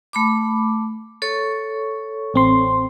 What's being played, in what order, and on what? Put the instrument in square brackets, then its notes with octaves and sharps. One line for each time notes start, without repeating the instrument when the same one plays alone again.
[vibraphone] A3 B5 D6
A4 C#5 C#6
[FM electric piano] A1 C4 C6